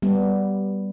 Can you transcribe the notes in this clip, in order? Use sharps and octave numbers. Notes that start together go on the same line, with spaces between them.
G3 B3